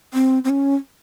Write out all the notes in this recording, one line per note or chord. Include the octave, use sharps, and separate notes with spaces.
C4
C4
C#4